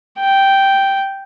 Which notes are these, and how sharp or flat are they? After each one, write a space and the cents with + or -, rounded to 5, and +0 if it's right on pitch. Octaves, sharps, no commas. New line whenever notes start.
G5 -5